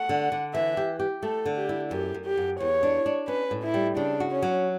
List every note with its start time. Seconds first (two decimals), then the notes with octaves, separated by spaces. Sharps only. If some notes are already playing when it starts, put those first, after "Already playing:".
Already playing: A3 F#5
0.09 D3
0.32 D3
0.54 E3 E5
0.77 G4
1.00 G4
1.23 A3 A4
1.46 D3
1.57 G4
1.69 E4
1.91 F#2 G4
2.14 F#2
2.26 G4
2.37 F#2
2.60 E2 C#5
2.83 D4
3.06 D4
3.28 C#4 B4
3.51 A2
3.63 E4
3.74 G3
3.97 C#3 D4
4.20 F#4
4.31 C#4
4.42 F#3